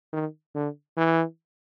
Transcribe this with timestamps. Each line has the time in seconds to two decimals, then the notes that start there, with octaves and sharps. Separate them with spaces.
0.13 D#3
0.55 D3
0.97 E3